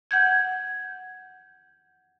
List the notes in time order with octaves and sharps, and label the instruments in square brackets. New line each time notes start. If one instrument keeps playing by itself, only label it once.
[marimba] F#5 G6 G#6